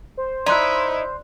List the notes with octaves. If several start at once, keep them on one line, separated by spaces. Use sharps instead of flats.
C5
D#4 E4 D5 C6 F#6